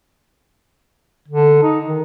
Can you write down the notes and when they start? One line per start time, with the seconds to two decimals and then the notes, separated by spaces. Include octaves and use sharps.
1.28 D3
1.63 D#4
1.87 D#3